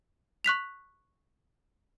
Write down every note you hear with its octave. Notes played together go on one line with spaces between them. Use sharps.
C#6 F#6 B6 F7